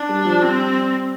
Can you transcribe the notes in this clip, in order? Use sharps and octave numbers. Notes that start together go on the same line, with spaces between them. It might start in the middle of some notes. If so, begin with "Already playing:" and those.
Already playing: D4
G3
F3
G3 C4